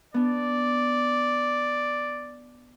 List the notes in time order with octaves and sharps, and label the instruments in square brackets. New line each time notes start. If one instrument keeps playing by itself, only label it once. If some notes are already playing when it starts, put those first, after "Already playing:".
[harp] B3 D4 [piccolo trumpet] D5